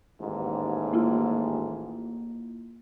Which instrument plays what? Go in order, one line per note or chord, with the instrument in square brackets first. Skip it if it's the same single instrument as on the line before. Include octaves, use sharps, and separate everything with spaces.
[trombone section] A1 D#2 G#2
[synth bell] A#3 E4 F4